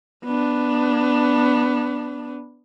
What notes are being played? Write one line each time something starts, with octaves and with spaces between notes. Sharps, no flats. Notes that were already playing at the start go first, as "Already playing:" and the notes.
B3 D4